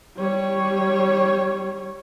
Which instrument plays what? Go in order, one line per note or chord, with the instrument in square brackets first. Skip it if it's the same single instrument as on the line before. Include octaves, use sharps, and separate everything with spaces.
[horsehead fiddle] G3 C#5